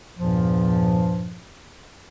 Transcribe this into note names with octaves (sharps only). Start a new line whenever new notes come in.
E2 G2 A#2 F3